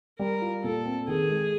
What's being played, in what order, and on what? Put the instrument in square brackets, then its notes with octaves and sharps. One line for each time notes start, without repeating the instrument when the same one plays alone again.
[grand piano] G3 [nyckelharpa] A#4
[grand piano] F4
[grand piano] A#2 [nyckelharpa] A4
[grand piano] C4
[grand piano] D#3 [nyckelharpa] G#4
[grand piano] G#3